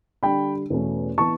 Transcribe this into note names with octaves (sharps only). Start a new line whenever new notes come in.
D3 G3 D4 G5 B5
E2 B2 A3 C#4
E3 B3 A5 C#6